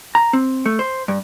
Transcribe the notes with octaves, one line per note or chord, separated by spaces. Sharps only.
A#5
C4
A3
C5
G2